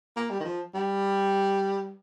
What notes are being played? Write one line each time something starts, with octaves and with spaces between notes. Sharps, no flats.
A#3
G3
D#3
F3
G3